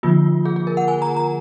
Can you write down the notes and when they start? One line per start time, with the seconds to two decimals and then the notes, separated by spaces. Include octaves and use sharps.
0.03 D3 F3 A#3 F4
0.45 G#4
0.56 G#4
0.67 A#4
0.77 F#5
0.88 G#5
1.02 A#5
1.17 A#5